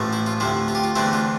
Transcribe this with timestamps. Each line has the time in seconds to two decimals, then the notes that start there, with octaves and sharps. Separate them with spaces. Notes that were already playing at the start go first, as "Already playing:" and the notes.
Already playing: A1 A2 F3 A3
0.13 E4
0.26 F4
0.40 D2 C3 F3 E4
0.68 F4
0.75 G4
0.84 F4
0.96 E2 D3 A3 C4 E4
1.13 F4